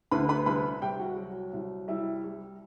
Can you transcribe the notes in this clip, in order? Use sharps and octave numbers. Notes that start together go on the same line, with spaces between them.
D2 B4 B5
B4 B5
C2 B4 B5
C2 G4 G5
F#4 F#5
F#3
C2
G3 E4 E5
G3